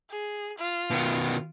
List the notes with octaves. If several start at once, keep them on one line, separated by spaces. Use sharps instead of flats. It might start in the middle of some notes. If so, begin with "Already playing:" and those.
G#4
F4
B2 D#3